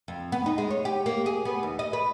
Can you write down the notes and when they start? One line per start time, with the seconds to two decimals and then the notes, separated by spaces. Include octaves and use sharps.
0.08 F2
0.32 B3
0.46 D#4
0.58 G#3
0.70 C#5
0.85 G4
1.06 A#3
1.26 G#4
1.45 B3
1.63 D#2
1.79 D#5
1.93 B4